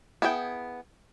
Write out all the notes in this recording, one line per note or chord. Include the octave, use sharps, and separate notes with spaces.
B3 E4 G#4 D#5 G5